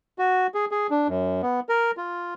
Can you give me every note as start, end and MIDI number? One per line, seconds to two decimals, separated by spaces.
0.19 0.47 66
0.54 0.65 68
0.71 0.87 68
0.90 1.08 62
1.08 1.41 42
1.42 1.60 59
1.69 1.91 70
1.97 2.34 65